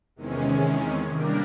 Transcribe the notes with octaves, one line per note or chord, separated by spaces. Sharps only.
E2 C3 D#3 G#3 C#4
G3 A#3 D4 G4 A#4